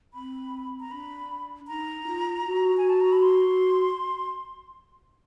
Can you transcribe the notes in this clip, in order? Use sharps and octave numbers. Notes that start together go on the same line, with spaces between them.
C4 B5
A#5
D4 B5
D#4 A#5
F4
F#4
G#5
A5
A#5
B5
C6